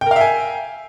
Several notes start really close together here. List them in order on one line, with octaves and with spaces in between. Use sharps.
G5 A#4 F5 E5 G#5